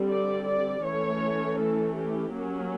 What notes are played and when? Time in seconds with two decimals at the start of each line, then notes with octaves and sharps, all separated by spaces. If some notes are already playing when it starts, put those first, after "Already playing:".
Already playing: D3 G3 C4
0.09 D5
0.47 D5
0.84 E3 A3 C#4 C#5
1.59 A4
1.96 G4
2.33 F#3 A#3 C#4